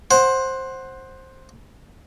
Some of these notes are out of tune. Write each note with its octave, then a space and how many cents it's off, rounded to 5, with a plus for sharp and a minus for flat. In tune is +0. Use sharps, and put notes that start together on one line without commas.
C5 +10 F#5 +0